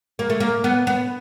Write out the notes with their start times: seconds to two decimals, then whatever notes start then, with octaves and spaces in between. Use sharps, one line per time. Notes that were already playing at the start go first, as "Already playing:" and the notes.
0.19 A#3
0.30 A3
0.40 A#3
0.64 B3
0.87 B3